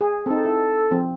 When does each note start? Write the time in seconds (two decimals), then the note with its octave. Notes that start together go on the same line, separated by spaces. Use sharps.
0.01 G#4
0.26 C4 D#4 A4
0.45 E4
0.91 F3 C4